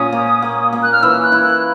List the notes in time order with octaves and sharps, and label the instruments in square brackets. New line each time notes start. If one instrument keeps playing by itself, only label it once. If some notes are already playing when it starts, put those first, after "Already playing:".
Already playing: [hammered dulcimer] A#2 C#4 [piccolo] D#6
[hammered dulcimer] A#3
A#3
A#3
[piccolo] F#6
F6
[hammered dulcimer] E3 [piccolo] E6
[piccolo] F#6
[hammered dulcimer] E4
[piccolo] F#6